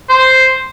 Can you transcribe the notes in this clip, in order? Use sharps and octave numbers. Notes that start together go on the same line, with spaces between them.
C5